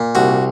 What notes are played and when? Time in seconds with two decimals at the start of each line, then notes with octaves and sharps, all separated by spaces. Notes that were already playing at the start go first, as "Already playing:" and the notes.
Already playing: A#2
0.15 C2 F#4